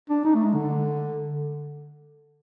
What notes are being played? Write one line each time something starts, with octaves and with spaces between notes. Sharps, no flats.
D4
D#4
A3
G#3
D3